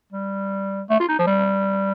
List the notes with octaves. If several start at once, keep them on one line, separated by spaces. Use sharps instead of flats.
G3
A3
F4
D#4
F3
G3